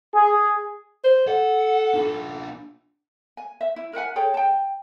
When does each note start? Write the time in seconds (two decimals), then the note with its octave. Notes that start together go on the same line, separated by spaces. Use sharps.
0.14 G#4
1.04 C5
1.27 A4 F#5
1.94 D4 F4
3.37 G#5
3.61 E5
3.76 E4
3.93 A#4 E5 F#5 G#5
4.16 G#4 A4 C#5 G5
4.34 G5 A5